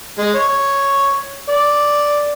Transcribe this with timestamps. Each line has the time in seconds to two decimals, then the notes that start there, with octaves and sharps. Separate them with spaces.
0.18 G#3
0.35 C#5
1.49 D5